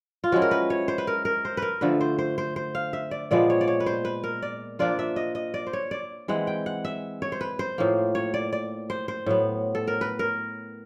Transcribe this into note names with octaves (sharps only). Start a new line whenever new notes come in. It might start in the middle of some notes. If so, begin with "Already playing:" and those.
F4
F3 G#3 C#4 E4 F#4
A#4
B4
C#5
C5
B4
A#4
A#4
C5
A#4 B4
D3 F3 A3 B4
C5
C5
C5
C5
F5
E5
D5
A#2 F3 G#3 B3 D5
C#5
D5
C#5
B4
C5
B4
A#4
D5
F3 A#3 D4 F4 D5
E5
D#5
D#5
D5
C5
C#5
D5
E3 G#3 C4 F#5
G5
F#5
E5
C#5
C5
B4
C5
A2 F3 A#3
C#5
D5
D5
C5
C5
A2 F#3 B3
A4
A#4
B4
A#4